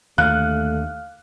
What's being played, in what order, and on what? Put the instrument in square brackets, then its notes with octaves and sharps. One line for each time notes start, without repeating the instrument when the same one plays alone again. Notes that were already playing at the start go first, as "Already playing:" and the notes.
[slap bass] D#2 D3 [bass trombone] A3 [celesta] F5 F6 [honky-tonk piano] F#6